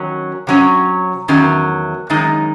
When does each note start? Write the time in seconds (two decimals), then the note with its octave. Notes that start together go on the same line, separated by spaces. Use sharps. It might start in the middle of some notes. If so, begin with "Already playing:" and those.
Already playing: D#3 F#3 C#4
0.47 C3 F#3 C#4
1.28 E2 D#3 F#3 C#4
2.10 F#2 D#3 G#3 D#4